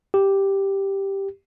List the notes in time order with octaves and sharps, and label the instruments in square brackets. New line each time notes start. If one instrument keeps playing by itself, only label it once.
[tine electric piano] G4